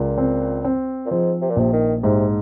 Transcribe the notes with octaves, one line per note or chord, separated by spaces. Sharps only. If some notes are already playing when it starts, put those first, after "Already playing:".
Already playing: C#2 A#2
C4
C4
A#2
G#2 F3
C3
A#2
A#1 C3
D#3
G#2 C3